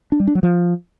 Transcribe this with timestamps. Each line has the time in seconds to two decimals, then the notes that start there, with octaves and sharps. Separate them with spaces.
0.12 D4
0.20 G3
0.27 D4
0.35 F#3
0.43 F3